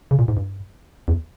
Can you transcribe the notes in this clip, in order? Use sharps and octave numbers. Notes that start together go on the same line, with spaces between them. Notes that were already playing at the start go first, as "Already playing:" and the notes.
C#3
A#2
G#2
G2
E2